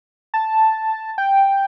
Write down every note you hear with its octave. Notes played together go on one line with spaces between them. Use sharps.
A5
G5